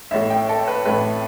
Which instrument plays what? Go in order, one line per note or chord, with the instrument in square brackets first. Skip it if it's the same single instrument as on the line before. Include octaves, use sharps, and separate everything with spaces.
[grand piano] A1 A2 A3 E5
G5
A4
B4
A1 A2 A3 B4